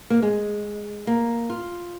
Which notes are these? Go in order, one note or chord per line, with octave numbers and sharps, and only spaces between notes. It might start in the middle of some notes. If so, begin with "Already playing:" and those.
A#3
G#3
A#3
F4